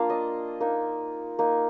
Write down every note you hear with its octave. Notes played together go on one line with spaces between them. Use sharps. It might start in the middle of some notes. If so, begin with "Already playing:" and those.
Already playing: A#3 D4 F4 F5
D#5
A#3 D#4
A#3 D#4